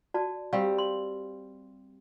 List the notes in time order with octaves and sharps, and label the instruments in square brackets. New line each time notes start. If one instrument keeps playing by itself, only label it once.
[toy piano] F#4 D5 A5
[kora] G3 C4 [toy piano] G4 F5
[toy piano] C6